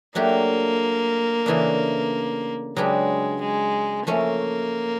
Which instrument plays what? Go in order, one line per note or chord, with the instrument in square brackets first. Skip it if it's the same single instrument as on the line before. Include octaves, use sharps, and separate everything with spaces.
[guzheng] F#3 A3 D4 G4 [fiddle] A#3
[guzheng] C#3 E3 A3 D4
[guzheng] C#3 F#3 B3 D4 G4 [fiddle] G#3
[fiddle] G#3
[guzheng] F3 A3 C#4 [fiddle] A#3